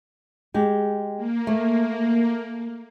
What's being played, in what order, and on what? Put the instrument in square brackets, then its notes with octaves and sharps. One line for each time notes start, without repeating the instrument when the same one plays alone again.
[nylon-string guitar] G#3 G4
[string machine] A#3
[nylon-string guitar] A3